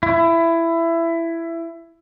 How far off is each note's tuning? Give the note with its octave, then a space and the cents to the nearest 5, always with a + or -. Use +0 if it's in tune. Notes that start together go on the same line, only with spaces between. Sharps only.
E4 +15